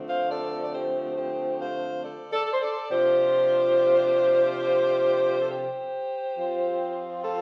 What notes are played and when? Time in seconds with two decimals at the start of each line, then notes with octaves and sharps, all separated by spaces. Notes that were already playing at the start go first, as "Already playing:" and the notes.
Already playing: D3 F3 A3 C4
0.08 C5 F5
0.30 A4 D5
0.62 D5
0.73 G4 C5
1.17 G4 C5
1.60 C5 F5
2.03 A4 D5
2.32 A4 D5
2.46 A4
2.53 C5
2.62 A4 D5
2.90 C3 F3 D4 F4 G4 C5
5.42 A4
5.51 G4 C5
6.37 F3 C4 F4
7.24 F4 A4